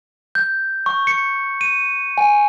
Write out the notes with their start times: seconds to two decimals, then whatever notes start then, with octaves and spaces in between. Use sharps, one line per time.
0.35 G6
0.86 C#6
1.07 C#7
1.61 D#7
2.18 G#5